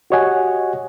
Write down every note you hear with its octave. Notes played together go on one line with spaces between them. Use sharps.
F#4 G4 C#5 D#5 F#5 G#5